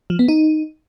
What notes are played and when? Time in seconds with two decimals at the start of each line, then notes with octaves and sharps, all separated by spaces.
0.10 F3
0.19 B3
0.28 D#4